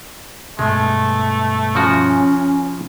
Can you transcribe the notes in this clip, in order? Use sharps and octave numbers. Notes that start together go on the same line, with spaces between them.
G2 B2 G#3 A3
C#3 F3 C#4 F#4